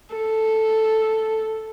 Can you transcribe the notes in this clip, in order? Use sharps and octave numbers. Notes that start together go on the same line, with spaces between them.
A4